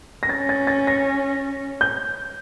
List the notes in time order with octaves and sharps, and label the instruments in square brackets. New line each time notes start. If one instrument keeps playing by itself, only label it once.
[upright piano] A#6
[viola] C#4 [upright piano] A6
[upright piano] A6
A6
A#6
G6